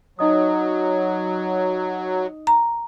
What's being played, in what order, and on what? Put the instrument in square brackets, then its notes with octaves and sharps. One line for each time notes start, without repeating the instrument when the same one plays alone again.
[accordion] F#3 [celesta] D#4 D#5 D#6
[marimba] A#5